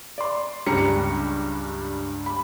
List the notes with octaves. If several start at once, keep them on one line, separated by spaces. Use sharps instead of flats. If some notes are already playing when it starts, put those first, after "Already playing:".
D5 C6
C#2 G2 G3 D4 A#5 C#7
B5